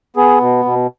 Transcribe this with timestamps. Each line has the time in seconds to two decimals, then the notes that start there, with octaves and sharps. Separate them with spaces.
0.16 B3 G#4
0.41 B2
0.65 B2